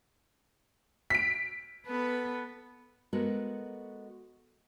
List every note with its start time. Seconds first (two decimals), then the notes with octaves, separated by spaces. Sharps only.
1.10 B6 D7
1.87 B3 A4 B4
3.13 G#3 B3 F#4 A4 A#4